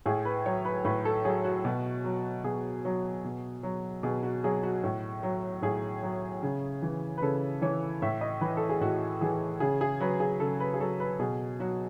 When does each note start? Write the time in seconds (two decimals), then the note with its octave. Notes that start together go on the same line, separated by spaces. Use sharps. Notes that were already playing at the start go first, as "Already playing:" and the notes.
0.06 A2 G#4
0.25 B4
0.46 F#3 C#5
0.65 B4
0.85 A2 B4
1.05 A4
1.25 F#3 G#4
1.44 F#4
1.65 B2
2.04 F#3
2.44 B2 G#4
2.85 F#3
3.25 B2
3.63 F#3
4.03 B2 G#4
4.23 F#4
4.44 F#3 G#4
4.63 F#4
4.84 A2
5.23 F#3
5.62 A2 G#4
6.03 F#3
6.43 C#3
6.82 E3
7.17 B4
7.22 C#3 A4
7.62 E3 C#5
8.02 A2 E5
8.21 D#5
8.41 E3 B4
8.57 A4
8.69 G#4
8.81 A2 F#4
9.21 E3 G#4
9.60 C#3 G#4
9.81 G#4
10.00 F#3 B4
10.20 G#4
10.40 C#3 A4
10.60 B4
10.74 G#4
10.80 F#3 A4
11.00 B4
11.20 B2 G#4
11.60 F#3 F#4